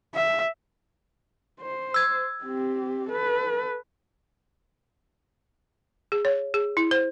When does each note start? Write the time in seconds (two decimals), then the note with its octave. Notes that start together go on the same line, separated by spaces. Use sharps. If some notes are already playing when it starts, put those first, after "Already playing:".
0.15 E5
1.61 C5
1.94 E6 G#6
2.44 C4 G4
3.10 A4 B4
6.12 G#4
6.25 C#5
6.54 G#4
6.77 E4
6.91 C5